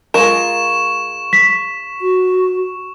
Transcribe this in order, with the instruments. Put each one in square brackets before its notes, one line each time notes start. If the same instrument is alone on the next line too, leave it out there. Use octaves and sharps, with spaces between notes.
[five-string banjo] G#3 F4 A#4 [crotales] C#6 E7
[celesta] B6
[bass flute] F#4